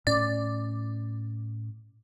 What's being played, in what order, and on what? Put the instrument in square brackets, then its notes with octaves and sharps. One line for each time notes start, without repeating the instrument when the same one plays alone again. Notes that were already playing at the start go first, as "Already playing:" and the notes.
[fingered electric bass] A2 C#4 [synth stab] D5